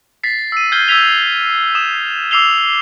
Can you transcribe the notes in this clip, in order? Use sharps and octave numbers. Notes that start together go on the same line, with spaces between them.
A6 B6 C7
E6 D#7
F6 G6 G#6 C7 G7
E6 G6 G#6 B6 F7 G7
D#6 E7
D6 E6 C7 F7 G7